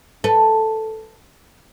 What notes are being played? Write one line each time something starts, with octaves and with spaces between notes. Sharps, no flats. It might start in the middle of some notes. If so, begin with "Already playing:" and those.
A4 B4